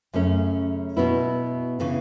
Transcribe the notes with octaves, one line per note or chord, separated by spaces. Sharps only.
F#2 C#3 A3 C#4
B2 B3 E4
C#3 E3